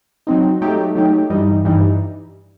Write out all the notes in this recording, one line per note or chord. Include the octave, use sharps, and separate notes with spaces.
F#3 C4 D#4
F#3 A3 D#4 G4
F#3 A3 D#4 G4
G2 E3 G3 D#4
G2 E3 G3 D#4